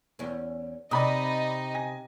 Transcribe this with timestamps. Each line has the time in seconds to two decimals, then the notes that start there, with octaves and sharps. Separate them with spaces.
0.19 E2 C#4
0.91 C3 D#4 D5 D#5 B5 D#6
1.74 G#5 A#6